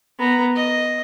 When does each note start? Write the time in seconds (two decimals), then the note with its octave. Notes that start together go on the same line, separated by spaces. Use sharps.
0.18 B3 A#5
0.56 D#5